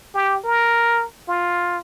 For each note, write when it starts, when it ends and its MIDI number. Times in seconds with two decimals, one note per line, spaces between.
0.15 0.38 67
0.44 1.04 70
1.28 1.78 65